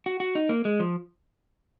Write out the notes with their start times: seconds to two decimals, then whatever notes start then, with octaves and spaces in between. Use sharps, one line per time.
0.06 F#4
0.20 F#4
0.35 D#4
0.49 A#3
0.65 G#3
0.80 F3